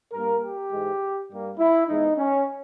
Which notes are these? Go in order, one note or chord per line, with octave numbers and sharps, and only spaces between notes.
G2 G3 A#3 A#4
G4
G#2 E3 G#3
G2 G3 A#3
E4
G#2 E3 G#3 B3 D#4
C#4